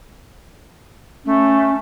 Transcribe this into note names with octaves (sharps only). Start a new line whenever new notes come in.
A3 C#4